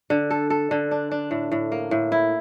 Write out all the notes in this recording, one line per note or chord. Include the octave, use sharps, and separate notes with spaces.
D3
A4
A4
D3
D4
D4
A2
A2
A#3
A2
E4